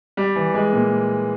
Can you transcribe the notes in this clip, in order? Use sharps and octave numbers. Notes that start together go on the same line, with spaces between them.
G3
E3
G#3
A#2